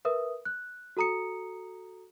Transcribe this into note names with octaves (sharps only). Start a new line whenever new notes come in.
A#4 B4 E5 D#6
F#6
F#4 A4 A#5 D#6 C#7